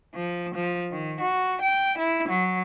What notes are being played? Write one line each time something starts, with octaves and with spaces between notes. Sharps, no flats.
F3
F3
D#3
F#4
G5
E4
F#3